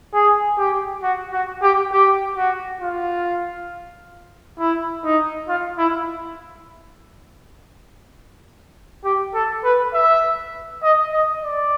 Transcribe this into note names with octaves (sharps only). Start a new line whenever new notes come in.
G#4
G4
F#4
F#4
G4
G4
F#4
F4
E4
D#4
F4
E4
G4
A4
B4
E5
D#5
D#5
D5